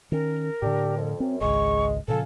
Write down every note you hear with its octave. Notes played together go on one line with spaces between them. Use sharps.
D#3 C#4 A#4
A2 D3 D4 G4
F2
F#2 C4
G#1 C#2 G#3 C#6
A#2 C#3 F3 A4 F5 G#5 A5